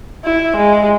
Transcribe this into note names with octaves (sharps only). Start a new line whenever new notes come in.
E4
G#3